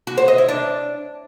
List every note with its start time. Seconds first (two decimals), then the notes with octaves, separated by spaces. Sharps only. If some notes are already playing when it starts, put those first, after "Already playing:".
0.07 F#4
0.18 C5
0.28 D#5
0.38 E4
0.49 D4